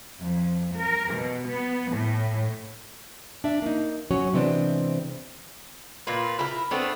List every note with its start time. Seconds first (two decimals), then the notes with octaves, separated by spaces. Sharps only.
0.19 F2
0.76 A#4
1.14 B2
1.47 B3
1.93 A2
3.44 D4 E5
3.62 A#3 D#4
4.11 F#3 C#4 F#4 C#5
4.33 C3 E3 G#3 B3 C4 D4
6.07 A#2 F4 B4
6.39 E4 A4 A#4
6.71 A3 B3 C4 D4